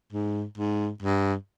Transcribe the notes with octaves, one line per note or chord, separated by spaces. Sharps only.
G#2
G#2
G2